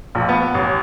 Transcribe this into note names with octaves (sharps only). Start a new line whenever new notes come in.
A#1
B3
A1